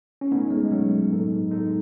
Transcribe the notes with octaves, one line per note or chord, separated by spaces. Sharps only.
C#4
B2 A3 B3 C#4 D#4
G#3
B2 F#3 A3 C#4
A2 G#3 D#4 A4
A2 G#3 D#4 A4